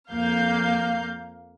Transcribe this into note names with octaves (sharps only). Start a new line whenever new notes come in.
F2 A#3 F5 G6